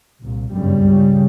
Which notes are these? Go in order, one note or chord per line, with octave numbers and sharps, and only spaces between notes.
C2 A#2
G1 F#2 C#3 G3
C#2 C#3